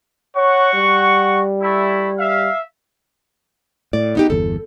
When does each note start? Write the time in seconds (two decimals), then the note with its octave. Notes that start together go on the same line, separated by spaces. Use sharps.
0.36 F#4 C#5 F#5 C#6
0.73 G3
1.62 A3 E4
2.19 E5 F5
3.93 A2 D5
4.15 B3 D#4 G4
4.30 G1 E2 A4